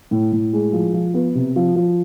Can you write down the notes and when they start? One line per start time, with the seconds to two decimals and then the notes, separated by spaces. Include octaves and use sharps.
0.11 A2
0.32 A2
0.53 G#3
0.73 F3
0.94 F3
1.14 B3
1.35 C3
1.56 F3
1.76 F3